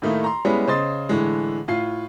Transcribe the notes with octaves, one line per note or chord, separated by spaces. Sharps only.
A2 D#3 A3 A#3 D#4 E4
A#5 C6
G3 G#3 B3 C#4 E4
C#3 C5 D#5 C6 A6
A2 D3 E3 G#3
A2 F4 C7